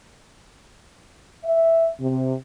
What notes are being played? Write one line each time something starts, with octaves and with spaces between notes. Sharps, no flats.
E5
C3